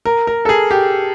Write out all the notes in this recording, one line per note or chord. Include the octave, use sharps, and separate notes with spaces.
A#4
A#4
A4
G#4
G4